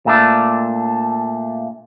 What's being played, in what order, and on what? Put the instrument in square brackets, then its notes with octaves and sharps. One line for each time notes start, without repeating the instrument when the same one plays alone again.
[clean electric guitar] A#2 A3 D4